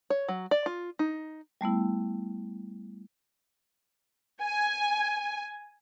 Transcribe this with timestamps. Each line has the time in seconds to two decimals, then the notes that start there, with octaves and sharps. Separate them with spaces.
0.10 C#5
0.28 F#3
0.51 D5
0.66 F4
0.99 D#4
1.61 G3 A3 B3 E4
4.41 G#5